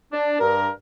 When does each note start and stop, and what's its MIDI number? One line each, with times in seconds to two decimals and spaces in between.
0.13 0.40 62
0.40 0.68 43
0.40 0.68 70